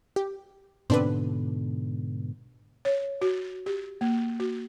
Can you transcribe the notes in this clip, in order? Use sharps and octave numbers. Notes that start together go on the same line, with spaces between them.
G4
G#2 B2 D3 C4 D4 B4
C#5
F#4
G4
A#3
F#4